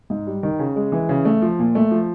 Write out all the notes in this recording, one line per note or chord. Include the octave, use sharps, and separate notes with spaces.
G#2
G3
D#3
C#3
G#3
E3
C#3
A3
F3
A#2
A3
F3